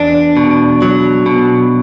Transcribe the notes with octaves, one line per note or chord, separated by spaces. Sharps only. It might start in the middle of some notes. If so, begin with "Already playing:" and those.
Already playing: E2 D4
B2
F#3
B2